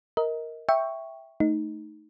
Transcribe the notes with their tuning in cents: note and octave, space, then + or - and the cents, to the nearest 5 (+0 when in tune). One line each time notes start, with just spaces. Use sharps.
A#4 +0 D#5 +25
E5 +0 G5 +5 C#6 +0
A3 +0 D#4 +0